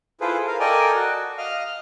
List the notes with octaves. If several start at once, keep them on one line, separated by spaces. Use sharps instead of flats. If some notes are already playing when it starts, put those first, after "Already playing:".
E4 F4 G#4 A4 B4 C5
A#4 F5
A4 A#4 D5 D#5 G5 G#5
F#4
D#5 F5 F6